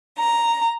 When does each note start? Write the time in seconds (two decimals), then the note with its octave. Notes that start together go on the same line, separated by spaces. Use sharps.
0.18 A#5